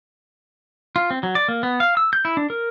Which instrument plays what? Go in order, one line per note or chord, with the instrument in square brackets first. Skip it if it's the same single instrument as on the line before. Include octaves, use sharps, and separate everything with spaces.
[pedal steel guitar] F4
C4
F#3
D5
A#3
B3
F5
E6
G6
E4
D4
A#4